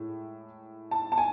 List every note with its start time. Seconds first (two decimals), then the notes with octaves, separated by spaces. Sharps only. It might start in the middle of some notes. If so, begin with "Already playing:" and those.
Already playing: A2 G#3
0.91 A5
1.12 A5
1.18 G#5